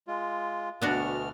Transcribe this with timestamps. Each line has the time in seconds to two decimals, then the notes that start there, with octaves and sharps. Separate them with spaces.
0.07 G#3 F4
0.82 D2 B2 B3 D4 F#4 F6